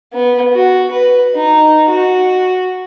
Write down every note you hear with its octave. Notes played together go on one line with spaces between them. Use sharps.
B3
F#4
B4
D#4
F#4